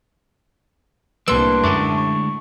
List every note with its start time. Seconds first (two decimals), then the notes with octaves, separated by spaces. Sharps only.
1.28 C2 A2 G3 A#3 D4 B4 C6 E6
1.64 F#2 D3 G#3 A3 C#6 D6
1.98 C#6